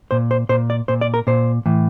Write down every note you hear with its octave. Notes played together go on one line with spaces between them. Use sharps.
A#2 C5
C5
A#2 C5
D5
A#2 C5
D5
A#4
A#2 C5
A2 E3